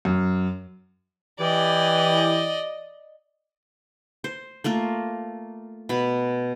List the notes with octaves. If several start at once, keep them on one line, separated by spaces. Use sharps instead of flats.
F#2
E3 G4 D5 D#5
C5
A3 A#3 F4 A#4
B2 B5